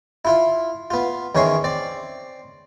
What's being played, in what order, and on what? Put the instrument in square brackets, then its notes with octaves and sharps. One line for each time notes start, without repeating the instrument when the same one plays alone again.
[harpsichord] E4 F4 E5
B3 F4
E2 D#3 C#4 C#5 E5 C6
C4 D5